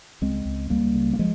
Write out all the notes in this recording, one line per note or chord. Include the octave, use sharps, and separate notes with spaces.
C#2 G#3 C4
C#2
C#2 G3 A#3
C#3
A#3
F3 G#3